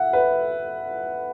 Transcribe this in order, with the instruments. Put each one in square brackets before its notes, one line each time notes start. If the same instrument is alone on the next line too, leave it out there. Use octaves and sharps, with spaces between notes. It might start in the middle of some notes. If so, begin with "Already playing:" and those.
Already playing: [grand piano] E5 F#5
B4